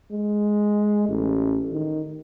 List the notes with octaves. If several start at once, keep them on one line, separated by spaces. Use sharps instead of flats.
G#3
A1
D#3